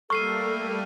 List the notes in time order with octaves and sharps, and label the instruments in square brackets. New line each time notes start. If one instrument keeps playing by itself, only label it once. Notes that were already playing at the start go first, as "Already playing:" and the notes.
[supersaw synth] G3 A3 A#3 [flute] A4 [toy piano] C#6 [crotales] F6 C7 D#7